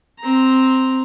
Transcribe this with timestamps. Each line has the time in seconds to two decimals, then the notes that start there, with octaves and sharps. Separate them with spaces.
0.20 C4 A#5